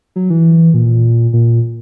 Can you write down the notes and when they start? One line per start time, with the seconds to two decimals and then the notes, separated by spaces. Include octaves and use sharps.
0.16 F#3
0.30 E3
0.74 A#2
1.33 A#2